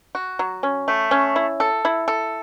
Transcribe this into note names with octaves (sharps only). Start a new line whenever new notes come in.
F#4
F#3
C#4
A3
C#4
E4
A4
E4
A4